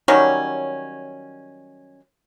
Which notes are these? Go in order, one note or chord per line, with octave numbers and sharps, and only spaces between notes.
D#3 F#3 G3 C#4